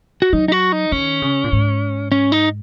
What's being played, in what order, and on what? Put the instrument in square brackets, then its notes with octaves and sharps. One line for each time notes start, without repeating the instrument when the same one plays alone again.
[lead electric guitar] F#4
[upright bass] F#3 [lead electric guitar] D#4
[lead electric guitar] D#4
F#4
D#4
[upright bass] D#3 [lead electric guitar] C#4
[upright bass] C#3
A#2
G#2
[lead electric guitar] C#4
D#4